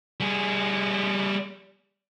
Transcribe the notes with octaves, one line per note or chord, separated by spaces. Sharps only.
G3 G#4